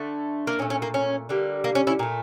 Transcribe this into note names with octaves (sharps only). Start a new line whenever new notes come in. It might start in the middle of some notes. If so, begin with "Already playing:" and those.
Already playing: D3 A3
A#3
A#2 A3 C#4
C#4
A#3
C#4
D3 G3 A#3
A#3
C#4
C#4 E4
A#2 A3